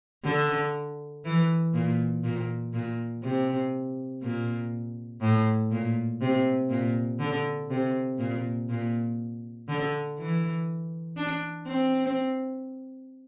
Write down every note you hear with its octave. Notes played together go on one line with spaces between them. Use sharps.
D3
E3
A#2
A#2
A#2
C3
A#2
A2
A#2
C3
A#2
D3
C3
A#2
A#2
D3
E3
D4
C4